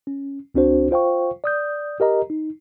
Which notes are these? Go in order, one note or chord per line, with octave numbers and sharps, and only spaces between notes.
C#4
C#2 C4 D4 F#4 C5
F4 C5 F5 G5 C#6
D5 D#6 G6
G4 A#4 D#5 A#5
D#4